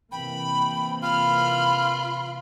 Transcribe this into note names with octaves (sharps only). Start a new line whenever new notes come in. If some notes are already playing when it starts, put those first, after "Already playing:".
C3 E3 A#3 G5 B5
F4 B5 F6